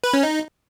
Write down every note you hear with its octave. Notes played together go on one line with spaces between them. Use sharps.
B4
C#4
D#4